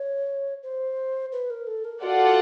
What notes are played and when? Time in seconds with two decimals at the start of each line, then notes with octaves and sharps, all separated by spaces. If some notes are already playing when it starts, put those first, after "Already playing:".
Already playing: C#5
0.63 C5
1.32 B4
1.50 A#4
1.67 A4
1.84 A#4
2.03 F4 F#4 A4 D5 F#5